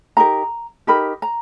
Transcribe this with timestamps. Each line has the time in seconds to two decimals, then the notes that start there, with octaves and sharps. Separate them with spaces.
0.17 D#4 G4 A#4 A#5
0.87 D#4 G4 A#4 B5
1.22 A#5